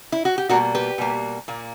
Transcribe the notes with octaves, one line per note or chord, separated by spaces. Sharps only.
E4
F#4
G4
B2 G3 A#3 F#4 A#4
G4 B4
B2 G3 A#3
A#2 A#3